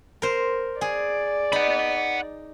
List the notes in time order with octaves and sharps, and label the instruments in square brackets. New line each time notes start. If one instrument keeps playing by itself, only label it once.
[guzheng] A#4 C5
[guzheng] G#4 [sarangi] D5
[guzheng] D#4 [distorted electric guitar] F#5 B5